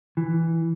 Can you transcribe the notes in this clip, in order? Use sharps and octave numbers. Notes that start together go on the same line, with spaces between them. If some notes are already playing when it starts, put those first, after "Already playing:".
E3